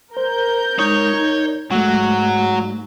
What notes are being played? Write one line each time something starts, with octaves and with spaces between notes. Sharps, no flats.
A#4 C5 G6
G#3 D#4 C#5 D#6
D#4
G#2 F#3 G#3 A3